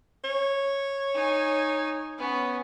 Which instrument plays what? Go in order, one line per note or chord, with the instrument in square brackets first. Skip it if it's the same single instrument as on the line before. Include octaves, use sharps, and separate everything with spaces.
[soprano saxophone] C#5
[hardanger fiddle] D#4 G#5
B3 C#4